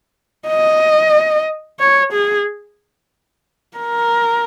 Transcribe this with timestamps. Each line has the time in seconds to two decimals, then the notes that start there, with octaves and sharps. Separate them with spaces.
0.48 D#5
1.80 C#5
2.13 G#4
3.77 A#4